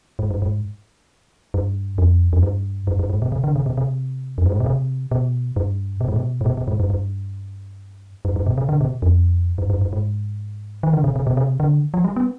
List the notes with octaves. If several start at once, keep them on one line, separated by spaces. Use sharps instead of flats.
G#2
G2
G#2
G2
F2
F2
G2
G2
G2
G#2
B2
C3
D3
C3
B2
C3
F2
G2
G#2
B2
C3
B2
G2
B2
G#2
B2
G#2
B2
B2
G#2
G2
G2
G2
G2
B2
C3
D3
B2
F2
G2
G2
G2
G#2
D#3
D3
C3
C3
B2
C3
D3
F3
G3
B3